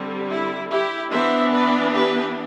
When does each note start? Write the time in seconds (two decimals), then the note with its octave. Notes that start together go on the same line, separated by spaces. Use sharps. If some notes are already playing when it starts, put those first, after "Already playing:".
Already playing: D3 G3 C4
0.30 E4
0.70 E4 G4
1.11 E3 B3 D4 C5 E5
1.52 B4 D5
1.92 G4 B4